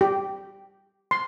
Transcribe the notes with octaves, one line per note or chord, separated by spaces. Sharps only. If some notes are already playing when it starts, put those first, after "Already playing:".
G4
C6